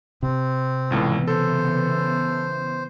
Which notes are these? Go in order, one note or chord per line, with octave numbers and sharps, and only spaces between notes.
C3 C4
G#1 C#2 A2 C#3 E3 B3
A4 C5